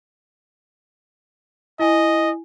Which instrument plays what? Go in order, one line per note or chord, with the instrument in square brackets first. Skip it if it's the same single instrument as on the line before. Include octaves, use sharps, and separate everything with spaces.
[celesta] E4 G#5 [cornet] D#5